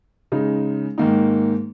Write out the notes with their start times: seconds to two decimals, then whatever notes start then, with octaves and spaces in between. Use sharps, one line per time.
0.32 C#3 G#3 D#4
0.98 G#2 D#3 A#3 D#4